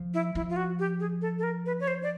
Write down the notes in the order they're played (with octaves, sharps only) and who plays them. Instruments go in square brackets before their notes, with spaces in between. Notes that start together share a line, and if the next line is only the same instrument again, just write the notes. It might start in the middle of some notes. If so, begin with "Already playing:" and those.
Already playing: [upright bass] F3
[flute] E4
[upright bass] F3 [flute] E4
[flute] F4
F#4
G4
G#4
A4
A4
A#4
B4
C#5
C5
D5